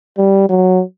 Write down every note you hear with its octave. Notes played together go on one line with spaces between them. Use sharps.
G3
F#3